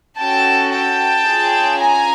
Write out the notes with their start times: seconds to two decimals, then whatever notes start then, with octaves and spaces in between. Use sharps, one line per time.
0.18 C#4 F#4 A4 G5 A5
0.71 G5 A5
1.24 C#4 F4 G#4
1.78 G#5 A#5